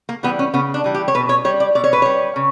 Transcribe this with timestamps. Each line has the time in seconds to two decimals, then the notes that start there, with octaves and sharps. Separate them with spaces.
0.09 A#3
0.23 E3 G3 B3
0.39 C#4
0.54 C#3 B3
0.74 D4
0.84 E3 G3
0.94 G4
1.08 C#5
1.15 B2 B4
1.29 C#5
1.45 G3 C#5
1.60 D5
1.75 B2 D5
1.84 C#5
1.93 B4
2.02 G3 C#5
2.36 C#3